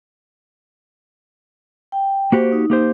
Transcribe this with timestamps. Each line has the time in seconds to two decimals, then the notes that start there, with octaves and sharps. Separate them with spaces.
1.92 G5
2.32 A#3 F#4 G4 C5
2.52 D#4
2.70 A#3 G4 C5